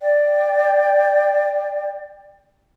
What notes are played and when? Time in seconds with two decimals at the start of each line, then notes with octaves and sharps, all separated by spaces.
0.01 D5 G5